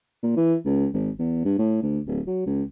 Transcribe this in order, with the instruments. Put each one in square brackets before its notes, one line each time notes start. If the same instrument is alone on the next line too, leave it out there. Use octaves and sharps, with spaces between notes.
[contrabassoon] A#2
E3
C#2
G#1
E2
G2
A2
D2
D1
F#3
C#2